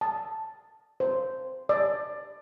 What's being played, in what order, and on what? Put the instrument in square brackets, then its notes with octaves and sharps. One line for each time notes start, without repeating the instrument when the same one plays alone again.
[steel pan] A5
C5
D5